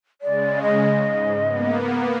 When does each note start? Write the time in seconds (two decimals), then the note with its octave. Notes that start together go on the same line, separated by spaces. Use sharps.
0.22 C#3 G#3 D5
0.62 D#5
1.08 G#2
1.44 A#3 B3